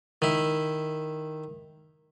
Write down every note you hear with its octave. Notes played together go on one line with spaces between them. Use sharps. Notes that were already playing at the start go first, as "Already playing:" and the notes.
D#3 E4